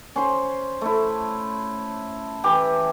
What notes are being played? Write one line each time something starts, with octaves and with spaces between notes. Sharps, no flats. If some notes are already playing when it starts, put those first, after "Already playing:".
C#4 C5 C6
A3 E4
E3 G4